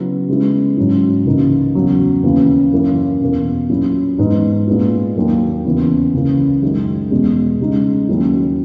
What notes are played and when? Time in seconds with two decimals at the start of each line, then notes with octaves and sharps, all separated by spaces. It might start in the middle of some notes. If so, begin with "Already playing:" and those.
Already playing: C#3 F#3 B3 E4
0.28 C#3 G#3 B3 E4
0.77 G#2 F#3 C#4 E4
1.25 C#2 C#3 E3 A#3 D#4
1.75 E2 C#3 F#3
2.23 D#2 C#3 E3 B3
2.73 F#2 E3 A#3 C#4
3.22 E2 B2 A#3
3.69 A#2 F#3 C#4 E4
4.18 G#2 E3 B3 D#4
4.67 A#2 G#3 B3 E4
5.16 D#2 D#3 F#3 A#3
5.64 E2 C#3 E3 B3
6.14 C#2 C#3 E3 A#3
6.62 F#2 D#3 G#3
7.11 E2 B2 G#3
7.60 C#3 G#3 D#4
8.09 D#2 D#3 F#3 C#4 E4